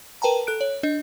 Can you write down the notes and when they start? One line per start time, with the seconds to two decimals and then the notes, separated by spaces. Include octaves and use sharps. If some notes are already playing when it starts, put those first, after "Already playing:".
0.22 A#4 B4 G5 A5 A#5
0.47 A4 F#6 D7
0.61 C#5
0.83 D4 D#5